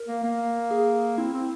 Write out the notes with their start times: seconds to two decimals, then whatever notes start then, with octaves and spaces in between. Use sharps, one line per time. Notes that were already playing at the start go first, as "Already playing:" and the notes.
Already playing: A#4
0.08 A#3
0.24 A#3
0.71 G#4
1.18 C4 E4
1.33 C4